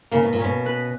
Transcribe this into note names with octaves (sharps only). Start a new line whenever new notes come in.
C#3 A#3
B2
A#2
C#4
B2
B4